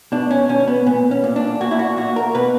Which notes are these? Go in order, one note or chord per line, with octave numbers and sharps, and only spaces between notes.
B2 D4
C#4
B2 C#4
B3
A#2 B3
C#4
A#2
D4
A#2 F#4
E4
F#4
A#2 F#4
A#4
B2 B4